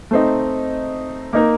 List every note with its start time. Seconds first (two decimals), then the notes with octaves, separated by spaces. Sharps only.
0.11 A3 C4 D#4
1.33 A#3 D#4 A#4